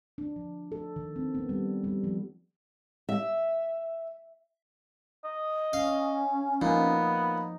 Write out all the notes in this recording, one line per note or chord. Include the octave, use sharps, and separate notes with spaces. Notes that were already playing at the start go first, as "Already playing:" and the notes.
D4
F3
A4
D#3
C4
B3
G3
G3
F3
E5
D#5
C#4 F5
A#2 F3 B3 D#4